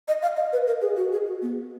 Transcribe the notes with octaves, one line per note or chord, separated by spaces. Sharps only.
D#5
F5
D#5
B4
A#4
G#4
F#4
G#4
F#4
B3